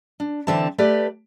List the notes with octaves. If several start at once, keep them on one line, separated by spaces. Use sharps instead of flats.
D4
D3 E3 C4 E5 A5
A3 G4 B4 D5